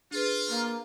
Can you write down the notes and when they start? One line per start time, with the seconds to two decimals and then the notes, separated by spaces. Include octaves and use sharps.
0.11 D4 F4 G#4 B4
0.48 A#3